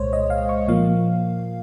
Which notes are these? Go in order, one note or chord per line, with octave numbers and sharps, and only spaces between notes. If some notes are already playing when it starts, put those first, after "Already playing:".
Already playing: C2 A#2 G#3 C5 C#5
D#5
F5
C#6
A#2 F3 A#3 F5